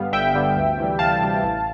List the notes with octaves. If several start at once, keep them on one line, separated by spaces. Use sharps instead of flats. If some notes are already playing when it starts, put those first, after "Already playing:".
Already playing: G2 D3 G3 B3 F5
G1 E5 G5
G2 D3 G3 B3
D2
C3 E3 G3
D2 F5 A5
C3 E3 G3
A1